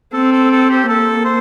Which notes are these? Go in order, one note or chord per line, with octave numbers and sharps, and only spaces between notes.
C4 A4
A4
A4
G4
A#3 A4
C5